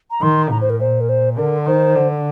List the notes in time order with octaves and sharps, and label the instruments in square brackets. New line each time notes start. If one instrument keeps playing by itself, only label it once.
[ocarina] A#5
[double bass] D#3 [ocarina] C6
[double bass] A2 [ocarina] A#5
[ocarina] C5
A#4
[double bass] A#2 [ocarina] C5
[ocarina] A#4
C5
[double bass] D3 [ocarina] A#4
[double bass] D#3 [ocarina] C5
[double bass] D3